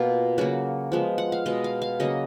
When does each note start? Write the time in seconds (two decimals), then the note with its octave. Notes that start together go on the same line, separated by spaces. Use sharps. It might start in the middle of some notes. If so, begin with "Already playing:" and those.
Already playing: B2 A#3 F4
0.38 C#3 F#3 A#3 F#4
0.92 F3 G#3 B3
1.18 F#5
1.32 F5
1.46 B2 G#3 B3 D#5
1.64 F5
1.82 F5
2.00 C#3 F#3 A#3 D#5